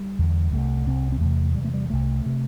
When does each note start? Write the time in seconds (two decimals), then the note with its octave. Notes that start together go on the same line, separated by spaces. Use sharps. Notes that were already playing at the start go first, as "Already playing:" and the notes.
Already playing: G3
0.19 E2 D3
0.53 C2 C3 A3
0.86 C2 C3 C4
1.12 C4
1.21 E2 C3 A3
1.55 E2 C3 G3
1.65 A3
1.74 G3
1.89 C2 C3 A3
2.26 C3